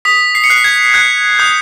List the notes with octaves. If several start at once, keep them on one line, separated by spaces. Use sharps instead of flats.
D#6 B6
C7
C#7
F#6 C7
G#6
F#6 G#6
D#6 G6